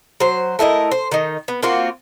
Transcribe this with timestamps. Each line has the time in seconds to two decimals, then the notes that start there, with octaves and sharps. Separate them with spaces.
0.20 F#3 C5
0.59 A3 E4 A#4 D#5
0.91 C5
1.11 D#3 D#4
1.48 B3
1.63 A#3 C4 F4 F#4